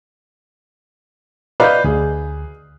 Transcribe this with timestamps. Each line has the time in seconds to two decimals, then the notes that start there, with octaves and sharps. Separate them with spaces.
1.60 B4 D5 D#5 F5 G6
1.84 D2 G#4